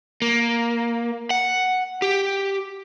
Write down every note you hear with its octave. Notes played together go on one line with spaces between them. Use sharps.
A#3
F#5
G4